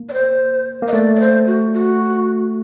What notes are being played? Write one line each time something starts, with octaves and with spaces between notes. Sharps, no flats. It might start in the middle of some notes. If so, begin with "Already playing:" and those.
Already playing: A#3
D5
C5
A#3
D#5
A3 D5
D5
C5
F#4
F#4